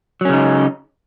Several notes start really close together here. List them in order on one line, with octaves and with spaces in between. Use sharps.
F#3 C#4 C#3 D#4